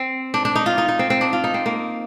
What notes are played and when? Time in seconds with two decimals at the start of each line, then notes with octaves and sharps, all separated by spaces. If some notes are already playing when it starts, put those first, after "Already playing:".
Already playing: C4
0.34 D4
0.45 D4
0.55 D#4
0.66 F4
0.78 D#4
0.88 D#4
0.99 C4
1.10 C4
1.21 D4
1.33 F4
1.44 D#4
1.54 C4
1.66 A#3